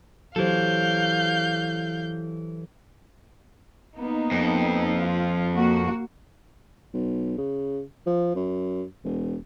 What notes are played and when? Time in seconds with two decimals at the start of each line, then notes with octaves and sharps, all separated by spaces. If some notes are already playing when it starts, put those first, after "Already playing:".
0.36 E3 F#3 G4 A4 C5 F5 G6
3.99 A#3 B3 D#4
4.31 F2
5.00 F4
5.55 A#3 F#4
6.94 B1
7.38 C#3
8.07 F3
8.35 F#2
9.05 E1